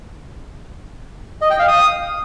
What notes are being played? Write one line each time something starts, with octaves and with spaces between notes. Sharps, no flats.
D#5
G5
F5
D#6